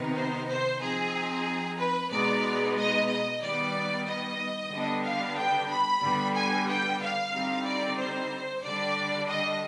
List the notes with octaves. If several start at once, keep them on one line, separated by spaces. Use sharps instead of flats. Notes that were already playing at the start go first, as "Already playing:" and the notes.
Already playing: C3 D#3 B3 D#4
C5
C5
F3 C4 D#4 G#4
B4
B2 G#3 B3 D#4 D5
D#5
D#5
D#3 G3 B3 D5
D#5
D3 G3 B3 D4
F5
G5
B5
D3 G3 B3
G#5
G5
F5
D3 G3 C4 D#4
D5
C5
D3 G3 D4 D5
D#5